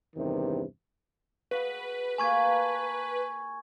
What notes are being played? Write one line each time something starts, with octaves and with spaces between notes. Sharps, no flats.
E2 G2 C3 D#3
F#4 G#4 B4
A#3 G4 F5 G#5 C#6 G#6
A5 B5